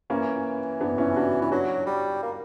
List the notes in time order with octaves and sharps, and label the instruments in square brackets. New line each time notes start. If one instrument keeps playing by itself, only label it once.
[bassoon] E3 [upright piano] A#3 C#4
[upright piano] B3 D4
C#4 E4
D4 F#4
[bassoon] E3
[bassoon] F#3 [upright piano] D4 F#4
[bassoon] G3
A#3